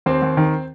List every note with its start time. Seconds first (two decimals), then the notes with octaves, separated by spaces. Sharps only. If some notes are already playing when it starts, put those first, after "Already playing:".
0.06 D#2 C4 C5
0.22 D#2
0.37 D#3